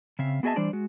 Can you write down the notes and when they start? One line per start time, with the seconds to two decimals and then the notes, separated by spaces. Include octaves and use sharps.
0.19 C#3 C4 E5 F5
0.43 B3 F#4 G#4 D#5 E5 A5
0.56 E3 G3 D4 C5 D5
0.73 G#3 F#4